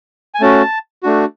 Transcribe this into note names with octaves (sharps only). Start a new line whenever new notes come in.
G#5
A3 C#4 F#4 A5
A3 D4 F#4